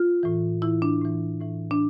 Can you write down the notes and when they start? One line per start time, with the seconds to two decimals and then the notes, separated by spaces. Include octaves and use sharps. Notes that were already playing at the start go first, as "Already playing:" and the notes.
Already playing: F4
0.23 A2 E3
0.62 A2 E3 E4
0.82 D4
1.01 A2 E3
1.41 A2 E3
1.71 D4